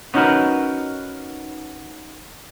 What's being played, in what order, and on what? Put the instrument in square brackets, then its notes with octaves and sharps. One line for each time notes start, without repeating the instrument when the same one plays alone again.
[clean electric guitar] B3 C#4 D#4 F#4 A#4 B4